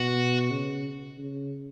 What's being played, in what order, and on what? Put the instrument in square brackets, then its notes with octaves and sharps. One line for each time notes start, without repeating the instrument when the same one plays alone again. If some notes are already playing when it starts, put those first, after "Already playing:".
Already playing: [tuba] B2 [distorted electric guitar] F#4
[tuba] C#3
C#3